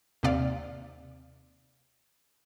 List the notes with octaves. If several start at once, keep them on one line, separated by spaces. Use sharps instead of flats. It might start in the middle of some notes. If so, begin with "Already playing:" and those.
D#2 C3 D5 F5